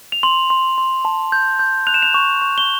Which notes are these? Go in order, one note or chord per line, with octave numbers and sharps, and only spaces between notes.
F7
C6 F#7
C6
C6
A5
G6
G6
F#6 F7
E7
F7
C#6
C#6
G7